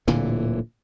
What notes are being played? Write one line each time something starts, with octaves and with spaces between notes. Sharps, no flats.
D1 A#2 D3 E3